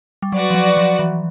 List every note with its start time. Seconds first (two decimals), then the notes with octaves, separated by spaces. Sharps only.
0.22 G3
0.32 F#3 F#4 B4 D5
0.50 F3
0.55 F#3
0.77 F3
0.99 E3